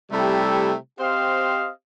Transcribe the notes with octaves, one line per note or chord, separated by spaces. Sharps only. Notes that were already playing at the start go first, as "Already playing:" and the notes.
C3 G3 A3 E4 A4
C4 G4 C5 D#5 F5